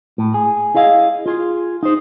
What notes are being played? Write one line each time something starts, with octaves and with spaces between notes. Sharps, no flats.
A2
G#4
E4 G#4 D#5 F5
F4 G#4
D#4 C5